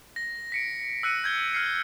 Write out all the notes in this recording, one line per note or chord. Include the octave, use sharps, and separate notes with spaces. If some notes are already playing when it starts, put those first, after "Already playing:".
A#6
B6 C#7 D7
E6 F#6 C#7 D#7
G6 G#6 G7
F6 C7 C#7